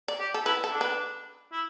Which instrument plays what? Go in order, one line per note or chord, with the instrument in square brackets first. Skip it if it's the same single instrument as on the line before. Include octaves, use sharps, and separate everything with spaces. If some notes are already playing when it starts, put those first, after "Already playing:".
[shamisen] D5
[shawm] G4
[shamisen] A4
[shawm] E4 [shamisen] B4
[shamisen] A4
[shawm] D4
[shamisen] B4
[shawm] E4